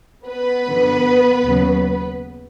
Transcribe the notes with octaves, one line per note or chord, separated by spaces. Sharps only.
B3 B4
F#2 D3 F3
D#2 C#3 F#3